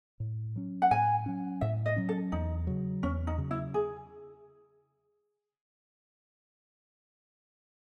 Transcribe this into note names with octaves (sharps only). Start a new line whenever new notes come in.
A2
F#3 C#4
F#5
A2 G#5
F#3 C#4
A2 E5
D#5
F#3 C#4
A4
E2 D#4
C#3 F#3
E2 C#4
D#4
C#3 F#3
E4
G#4